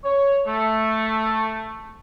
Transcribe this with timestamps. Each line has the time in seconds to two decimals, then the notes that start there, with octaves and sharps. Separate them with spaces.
0.04 C#5
0.46 A3